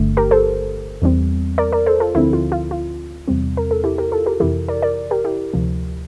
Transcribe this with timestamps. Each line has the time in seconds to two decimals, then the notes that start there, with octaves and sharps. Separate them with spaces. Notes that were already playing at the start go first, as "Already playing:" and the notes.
Already playing: G1 G2 D3 A3
0.17 G4 A#4
0.31 A4 C5
1.02 E2 E3 G3 C4
1.58 A#4 D5
1.72 A#4 D5
1.86 A4 C5
2.00 F4 A4
2.15 D2 D3 F3 C4 E4
2.33 F4
2.52 F4
2.71 F4
3.28 E2 C3 G3 C4
3.57 A#4
3.71 A4
3.84 E4 G4
3.98 G4 A#4
4.12 F4 A4
4.26 G4 A#4
4.40 F2 C3 E3 E4 G4
4.68 A#4 D5
4.82 A#4 D5
5.11 G4 A#4
5.25 E4 G4
5.54 D2 C3 F3